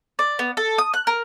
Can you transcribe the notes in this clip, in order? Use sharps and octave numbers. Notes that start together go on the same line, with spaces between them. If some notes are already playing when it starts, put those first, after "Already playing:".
D5
B3
A4
D#6
F#6
A#4